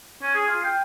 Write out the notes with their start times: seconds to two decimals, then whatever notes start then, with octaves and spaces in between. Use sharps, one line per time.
0.22 C#4
0.35 G#4
0.47 F4
0.64 G5